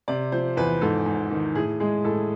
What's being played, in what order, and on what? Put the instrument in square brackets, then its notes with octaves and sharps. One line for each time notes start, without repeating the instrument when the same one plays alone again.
[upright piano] C3 D5
F3 C5
E2 B4
G#2 A4
G#2
D#3
A2 G#4
G#3 G#4
A2 A4